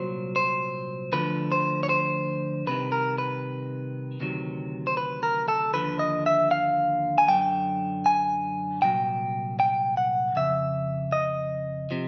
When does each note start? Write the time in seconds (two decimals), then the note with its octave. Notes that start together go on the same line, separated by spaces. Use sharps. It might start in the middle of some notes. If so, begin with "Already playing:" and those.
Already playing: C2 A#2 F#3 C5
0.36 C5
1.12 D2 D3 F3 B4
1.52 C5
1.83 C#5
1.89 C5
2.66 C2 C3 D#3 B4
2.92 A#4
3.18 B4
4.20 D2 C3 D#3 F#3
4.87 C5
4.97 B4
5.23 A#4
5.48 A4
5.74 D#2 D3 F3 B4
5.99 D#5
6.26 E5
6.51 F5
7.18 G#5
7.28 F#2 D3 F#3 G5
8.06 G#5
8.82 C2 A#2 F#3 G5
9.60 G5
9.97 F#5
10.36 F2 C#3 E5
11.12 D#5
11.91 C3 F3